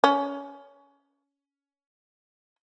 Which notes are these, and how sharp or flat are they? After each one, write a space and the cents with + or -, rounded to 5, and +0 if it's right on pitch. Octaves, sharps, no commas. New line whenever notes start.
C#4 +20